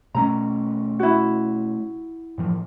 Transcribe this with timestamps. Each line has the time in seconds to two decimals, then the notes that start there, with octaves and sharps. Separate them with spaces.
0.15 B2 A3 C#4 A#5
1.00 E4 F#4
2.38 A2 E3 F3